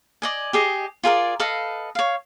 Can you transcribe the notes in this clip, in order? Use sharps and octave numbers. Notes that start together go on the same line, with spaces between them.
D5 D#5 G#5
G4 G#4 D#5
F4 G#4 A#4 D5
A4 B4 D#5 F5
C#5 F5